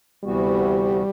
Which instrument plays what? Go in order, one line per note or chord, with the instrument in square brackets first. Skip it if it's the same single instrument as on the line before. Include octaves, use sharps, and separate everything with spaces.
[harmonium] D2 C3 E3 B3 F#4 [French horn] G3